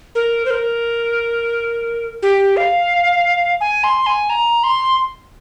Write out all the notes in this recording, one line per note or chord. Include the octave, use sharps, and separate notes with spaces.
A#4
C5
A#4
G4
F5
G#5
C6
G#5
A#5
C6